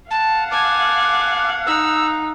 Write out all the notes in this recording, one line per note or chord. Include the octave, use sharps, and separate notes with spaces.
F5 F#5 A5
G#5 A5 D6
D#4 E6